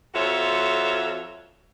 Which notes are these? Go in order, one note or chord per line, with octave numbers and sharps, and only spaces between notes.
F2 F4 F#4 A4 C#5 E5